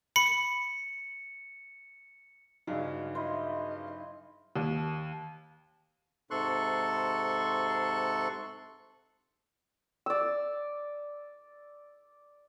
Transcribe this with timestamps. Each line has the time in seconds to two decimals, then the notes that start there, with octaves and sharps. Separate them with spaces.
0.16 B5 C#7
2.67 G2 C#3 F#3 G#3 D#4
3.15 E4 C5 D#5
4.56 D#2
6.31 G#2 C3 A4 C6 C#6 F#6
10.06 D5 E6